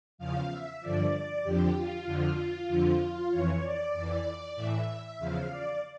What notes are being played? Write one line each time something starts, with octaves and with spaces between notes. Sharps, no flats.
E2 C#3 F3 F5
E5
G2 D3 F3 D5
F2 D3 F3 G4
F4
F2 D3 F3
F2 D3 F3
F2 E3 C#5
D5
F2 E3
A2 E3 E5
E2 C#3 F3 F5
D5